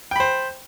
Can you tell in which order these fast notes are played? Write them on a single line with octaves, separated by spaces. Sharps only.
G5 B5 C5